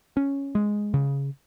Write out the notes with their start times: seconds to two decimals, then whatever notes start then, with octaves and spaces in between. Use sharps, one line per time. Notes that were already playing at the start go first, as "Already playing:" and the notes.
0.17 C#4
0.55 G#3
0.94 C#3